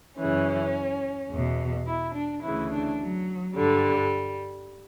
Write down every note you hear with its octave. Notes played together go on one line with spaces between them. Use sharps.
F#2 C#3 E3 C#4
E2 B2
E4
D4
D2 C#3 E3 E4
D4
F#3
G2 D3 G3